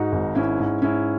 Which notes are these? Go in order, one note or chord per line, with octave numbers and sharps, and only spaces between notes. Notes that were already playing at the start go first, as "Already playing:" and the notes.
Already playing: G#2 D#4 F#4
G#1
G#2 C#4 E4
G#2
G#2 C#4 E4